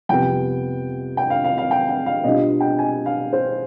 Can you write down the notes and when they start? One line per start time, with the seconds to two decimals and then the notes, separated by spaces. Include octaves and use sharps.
0.09 F2 C3 G3 B3 G5
1.17 G5
1.30 F5
1.44 F5
1.58 F5
1.71 G5
1.89 G5
2.06 F5
2.24 B2 G3 D4 F4 D#5
2.60 G5
2.79 G#5
3.06 F5
3.33 C5